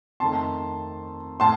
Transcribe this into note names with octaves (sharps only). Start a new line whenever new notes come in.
F2 D#3 A3 A5 C6
A2 A5 C6